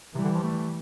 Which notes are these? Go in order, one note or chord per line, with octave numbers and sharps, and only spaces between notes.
C3 E3 G3
D3
F3
A3